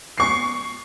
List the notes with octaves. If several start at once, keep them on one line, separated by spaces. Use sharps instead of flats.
C#6 C7